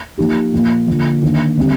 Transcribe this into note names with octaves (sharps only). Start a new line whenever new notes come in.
F3 A#3 D#4 G4
A#2 F3 A#3
D3 F3 A#3 F4
D#3 A#3 D4
D3 G3 C4 G4